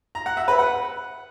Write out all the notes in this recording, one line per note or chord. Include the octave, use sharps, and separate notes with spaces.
A#5
F#5
E5
B4
F#5